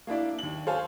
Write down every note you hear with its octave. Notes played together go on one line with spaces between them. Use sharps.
A#3 D4 E4 D5
D#2 F#7
A4 C5 C#5 F5 G#5 A5